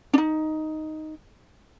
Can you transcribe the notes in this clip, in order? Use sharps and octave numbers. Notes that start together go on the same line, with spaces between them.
D4 D#4